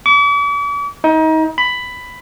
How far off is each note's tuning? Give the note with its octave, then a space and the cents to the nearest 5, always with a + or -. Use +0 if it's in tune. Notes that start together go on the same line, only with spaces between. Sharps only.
D6 -45
D#4 +30
B5 +10